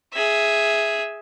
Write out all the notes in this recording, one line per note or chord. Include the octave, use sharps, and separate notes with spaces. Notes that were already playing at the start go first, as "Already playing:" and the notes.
G#4 E5